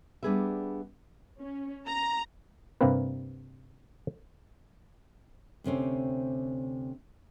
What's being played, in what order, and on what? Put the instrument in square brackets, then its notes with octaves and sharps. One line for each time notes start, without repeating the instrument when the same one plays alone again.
[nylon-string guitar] G3 B3 D4 G#4 B4 E5
[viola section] C#4
A#5
[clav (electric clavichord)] G2 C3 G3 A#3 C4 B4
[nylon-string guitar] D2 C3 C4 C#4